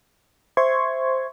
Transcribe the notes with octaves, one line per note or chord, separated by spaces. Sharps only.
C5 E5 C6 C#6 G#6